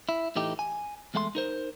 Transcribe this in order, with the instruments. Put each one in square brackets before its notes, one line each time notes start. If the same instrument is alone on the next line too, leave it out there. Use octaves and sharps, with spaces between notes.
[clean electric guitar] E4
A2 E3 A3 D#4 G4
G#5
E2 G#3 A3 F#5 C6
D#4 A#4 C5